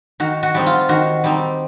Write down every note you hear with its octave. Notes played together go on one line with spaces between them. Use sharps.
D#3 F#4
F#4
G3 C4 D#4
F4
D#3 F#4
G3 C4 D#4